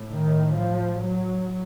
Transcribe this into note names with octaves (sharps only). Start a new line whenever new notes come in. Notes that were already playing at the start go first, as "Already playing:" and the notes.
Already playing: A2
D#3
F3
F#3